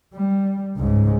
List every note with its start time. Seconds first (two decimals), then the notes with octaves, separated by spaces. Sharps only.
0.14 G3
0.76 C#2 G#2